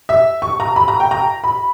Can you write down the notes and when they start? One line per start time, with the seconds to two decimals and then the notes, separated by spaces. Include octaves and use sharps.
0.09 E5
0.42 C#6
0.60 A#5
0.76 B5
0.88 A#5
1.00 G5
1.11 A#5
1.44 B5